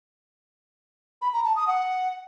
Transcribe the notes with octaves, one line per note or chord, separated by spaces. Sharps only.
B5
A#5
A5
D#6
F#5